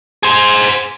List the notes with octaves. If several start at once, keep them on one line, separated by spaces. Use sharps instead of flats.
G#4 C5